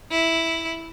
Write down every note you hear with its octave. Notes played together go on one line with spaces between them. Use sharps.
E4